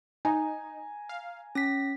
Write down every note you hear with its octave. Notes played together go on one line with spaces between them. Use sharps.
D#4 G#5 A#5
F5
C#4 A#6 B6